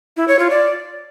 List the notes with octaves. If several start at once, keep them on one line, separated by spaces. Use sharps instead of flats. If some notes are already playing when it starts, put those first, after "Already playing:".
E4
C#5
F4
D5